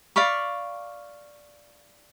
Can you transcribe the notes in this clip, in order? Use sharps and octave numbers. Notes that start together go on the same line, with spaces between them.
D5 F5 B5 C#6